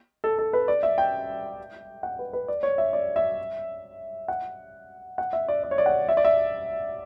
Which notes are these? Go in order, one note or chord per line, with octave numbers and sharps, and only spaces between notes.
A4
A4
B4
D5
E5
G5
F#5
B4
B4
D5
C#5
E5
D5
E5
F#5
F#5
E5
D5
D5
C#5
D5
F#5
E5
D5
E5